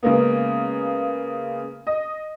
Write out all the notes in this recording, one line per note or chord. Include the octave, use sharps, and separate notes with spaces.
C#3 G#3 A#3 B3
D#5